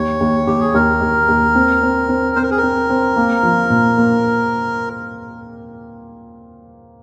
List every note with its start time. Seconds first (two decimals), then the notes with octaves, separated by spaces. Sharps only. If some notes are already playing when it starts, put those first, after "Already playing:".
Already playing: D#2 C#5
0.20 D#2
0.47 D#2 G4
0.60 G#4
0.74 D#2 A#4
1.01 D#2
1.28 D#2
1.55 C4
1.83 C4
2.09 C4
2.36 C4 C5
2.43 A#4
2.51 G#4
2.58 A#4
2.63 C4
2.90 C4
3.16 A#3
3.43 F3
3.70 A#2
3.97 A#3